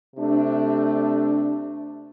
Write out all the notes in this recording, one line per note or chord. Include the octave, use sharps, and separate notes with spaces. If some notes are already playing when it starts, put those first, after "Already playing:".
C3 A3 D4